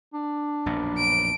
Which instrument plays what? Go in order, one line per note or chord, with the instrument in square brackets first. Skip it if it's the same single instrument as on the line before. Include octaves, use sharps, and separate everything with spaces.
[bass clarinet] D4
[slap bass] A#1 F#2 B2
[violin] D7